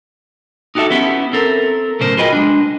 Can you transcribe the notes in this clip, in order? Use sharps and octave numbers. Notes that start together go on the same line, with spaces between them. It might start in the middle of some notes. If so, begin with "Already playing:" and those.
D#4 F#4 G4 A4 E5
B3 C#4 E4 G4
C4 A4 A#4
B1 A2 C#3 A#4 C5
F4 F#4 G#4 B4 D#5 G5
G#3 D4